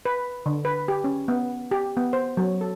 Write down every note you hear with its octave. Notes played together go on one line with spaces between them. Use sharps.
B4
D3
B4
G4
C#4
B3
G4
B3
C5
F#3
A4